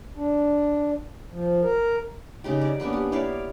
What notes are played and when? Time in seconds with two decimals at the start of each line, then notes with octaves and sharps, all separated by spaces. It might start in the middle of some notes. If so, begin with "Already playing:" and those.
0.15 D4
1.30 F3
1.62 A#4
2.44 C#3 D#4 G4
2.61 D5
2.80 A#3 B3 C#4 D4
2.93 G4
3.12 E4 C#5 D5 F5